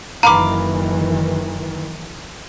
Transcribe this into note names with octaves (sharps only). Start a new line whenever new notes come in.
F#1 D#3 E3 F5 A#5 B5 D6